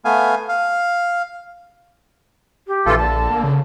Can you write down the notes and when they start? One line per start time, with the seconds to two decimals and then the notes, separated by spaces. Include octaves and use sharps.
0.05 A3 B3 F5 G#5
0.49 F5
2.67 G4
2.86 A#1 E3 F4 A4
2.98 D3 A5
3.30 A#3
3.44 C#3